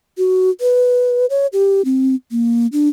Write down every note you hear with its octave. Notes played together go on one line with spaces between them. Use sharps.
F#4
B4
C#5
G4
C4
A#3
D4